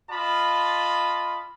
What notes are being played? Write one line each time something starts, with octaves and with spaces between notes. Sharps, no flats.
F4 D#5 A5 B5